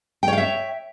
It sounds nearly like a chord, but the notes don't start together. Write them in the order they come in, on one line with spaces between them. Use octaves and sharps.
G5 C#5 F5 E5